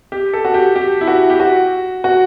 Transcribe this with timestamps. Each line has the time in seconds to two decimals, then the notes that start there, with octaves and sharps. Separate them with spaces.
0.12 G4
0.33 A4
0.45 F#4
0.54 G4
0.76 G4
1.01 E4
1.08 F#4
1.30 G4
1.40 F#4
2.04 F#4